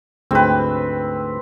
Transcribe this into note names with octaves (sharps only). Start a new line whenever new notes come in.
D2 G#2 G#3 C4 B4